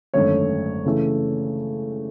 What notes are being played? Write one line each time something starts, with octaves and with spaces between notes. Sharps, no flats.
G#1 F#2 D3 A3 C#5
C#3 E3 A3